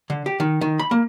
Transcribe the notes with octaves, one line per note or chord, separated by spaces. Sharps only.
D3
G4
D#3
D#3
B5
A#3